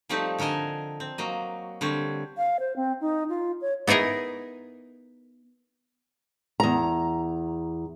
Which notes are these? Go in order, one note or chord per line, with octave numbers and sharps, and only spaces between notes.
F3 G3 A3 C4 D#4 G4
D3 A4 A#4 D#5 G#5
C4
F#3 A#3 D#5
D3 G3 C4 C#5
F5
C5
C4
D#4
F4
C#5
B3 D#4 E4 G#4 A#4
E2 A#5